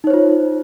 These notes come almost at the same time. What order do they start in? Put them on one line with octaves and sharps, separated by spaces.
D#4 C#5 C5 F4